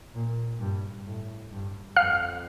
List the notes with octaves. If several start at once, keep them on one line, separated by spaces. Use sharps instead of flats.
A#2
G2
A2
G2
F2 F5 F6